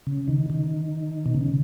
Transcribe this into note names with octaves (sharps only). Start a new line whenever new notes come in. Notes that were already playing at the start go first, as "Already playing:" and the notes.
C#3
D#3
D#3
B2
C#3